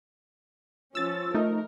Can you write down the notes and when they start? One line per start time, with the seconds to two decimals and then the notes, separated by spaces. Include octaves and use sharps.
0.95 F3 C#4 E6 A6
1.34 A3 D#4 A#4